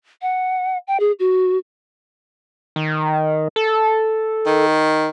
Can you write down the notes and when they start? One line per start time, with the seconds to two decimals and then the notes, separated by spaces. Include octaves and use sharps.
0.22 F#5
0.87 G5
1.00 G#4
1.19 F#4
2.76 D#3
3.56 A4
4.46 D#3